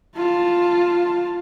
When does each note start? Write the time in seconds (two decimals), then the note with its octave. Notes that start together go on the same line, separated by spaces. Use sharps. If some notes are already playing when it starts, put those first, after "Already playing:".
0.16 F4 A5